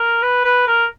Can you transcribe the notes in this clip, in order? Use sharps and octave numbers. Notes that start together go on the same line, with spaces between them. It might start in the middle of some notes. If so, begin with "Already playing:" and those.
Already playing: A#4
B4
B4
A#4